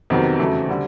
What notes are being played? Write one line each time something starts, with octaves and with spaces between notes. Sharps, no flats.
F2 C3 D#3 F#3 B3
E2 C#3 F#3 A3
D3 G3